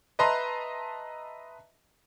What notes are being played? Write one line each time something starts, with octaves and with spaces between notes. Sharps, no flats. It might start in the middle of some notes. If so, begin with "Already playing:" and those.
B4 D#5 E5 A5 A#5 C6